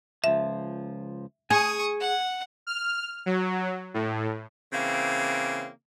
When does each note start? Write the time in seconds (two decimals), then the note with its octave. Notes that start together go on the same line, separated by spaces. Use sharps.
0.24 C#2 F3 E5
1.50 G#4 G#5 C#6 D#6
2.01 F#5
2.67 F6
3.26 F#3
3.94 A2
4.72 C#3 E3 A#3 C4